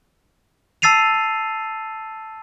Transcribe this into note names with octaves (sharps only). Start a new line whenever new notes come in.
A5 E6 A6 C7 D#7 F7